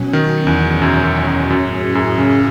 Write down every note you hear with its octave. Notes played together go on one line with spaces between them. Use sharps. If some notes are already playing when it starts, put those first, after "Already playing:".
Already playing: B2 F#3 C#4
D#3
E2
F#2
F#2
F#2
F#2 A2 F#3 C#4 G#4
F#2
C#3